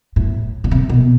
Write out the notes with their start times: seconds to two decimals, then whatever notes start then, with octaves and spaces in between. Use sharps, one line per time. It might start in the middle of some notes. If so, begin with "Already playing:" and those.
0.16 A2
0.64 B2
0.71 C3
0.89 B2